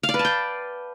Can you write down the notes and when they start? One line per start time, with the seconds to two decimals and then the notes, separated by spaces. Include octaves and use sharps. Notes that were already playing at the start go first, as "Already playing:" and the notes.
0.03 F5
0.09 D5
0.14 B4
0.19 A5
0.25 G5